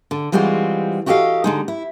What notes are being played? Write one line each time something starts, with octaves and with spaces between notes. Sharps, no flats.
D3
E3 G3 G#3 C4 F4 F#4
E4 F#4 G4 A4 D#5 F5
D3 G#3 D#4
E4